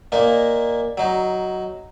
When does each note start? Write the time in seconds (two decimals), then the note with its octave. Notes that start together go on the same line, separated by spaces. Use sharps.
0.12 A#2 A#3 D#4
0.98 F#3 D#4